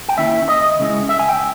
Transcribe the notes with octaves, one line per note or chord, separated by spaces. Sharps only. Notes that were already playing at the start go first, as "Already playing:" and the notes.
G5
D#3 A#3 C#4 E4 E5
D#5
C#3 G#3 C#4 E4
E5
G#5
G5